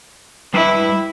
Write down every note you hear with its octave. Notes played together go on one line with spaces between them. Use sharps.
G3 E4 B4